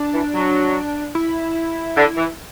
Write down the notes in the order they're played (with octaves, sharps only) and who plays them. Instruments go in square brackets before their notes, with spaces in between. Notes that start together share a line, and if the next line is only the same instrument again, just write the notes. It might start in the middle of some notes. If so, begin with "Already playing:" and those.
Already playing: [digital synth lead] D4
[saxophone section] E3
F#3
[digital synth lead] E4
[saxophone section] D3
E3